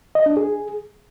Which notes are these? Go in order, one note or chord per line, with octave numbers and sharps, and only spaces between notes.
D#5
D4
G#4